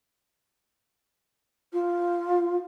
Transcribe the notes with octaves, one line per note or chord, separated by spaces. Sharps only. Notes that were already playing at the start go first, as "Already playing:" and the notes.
F4